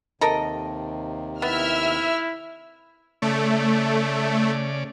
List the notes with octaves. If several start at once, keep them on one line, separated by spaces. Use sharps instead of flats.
D#2 C3 D#3 A4 A#4 D#5
B3 E4 E5 E6 F6
C#3 A3 D5